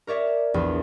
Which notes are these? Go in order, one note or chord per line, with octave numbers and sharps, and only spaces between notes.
A#4 C#5 D5 E5
A#1 E2